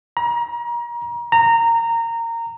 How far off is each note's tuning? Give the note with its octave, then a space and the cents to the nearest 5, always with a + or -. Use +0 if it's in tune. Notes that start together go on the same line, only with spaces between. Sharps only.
A#5 +35
A#5 -15